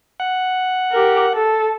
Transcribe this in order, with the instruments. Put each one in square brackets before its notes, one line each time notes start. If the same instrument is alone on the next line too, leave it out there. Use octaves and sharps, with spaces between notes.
[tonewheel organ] F#5
[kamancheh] G4 A#4
A4